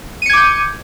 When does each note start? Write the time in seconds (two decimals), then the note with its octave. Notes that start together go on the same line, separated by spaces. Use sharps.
0.22 D#7
0.26 C#7
0.30 G#6
0.33 D6
0.37 G6